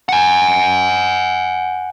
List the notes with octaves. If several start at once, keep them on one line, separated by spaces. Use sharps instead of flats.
F#5 G#5